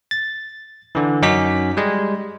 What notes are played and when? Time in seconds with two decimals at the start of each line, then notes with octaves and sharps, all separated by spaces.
0.11 A6
0.95 D3 E3
1.22 F#2 C#4 D#4 F#4 D6 B6
1.77 G3 G#3